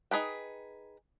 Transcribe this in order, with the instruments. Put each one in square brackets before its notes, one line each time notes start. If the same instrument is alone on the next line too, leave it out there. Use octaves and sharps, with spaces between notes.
[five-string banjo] D#4 G#4 B4 G5